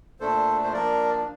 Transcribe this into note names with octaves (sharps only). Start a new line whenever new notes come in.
A#2 A3 D4 A4 C5
C5
F3 A#3 D4 A#4 D5